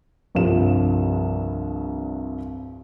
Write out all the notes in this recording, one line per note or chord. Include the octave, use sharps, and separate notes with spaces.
C2 G2 F3 E7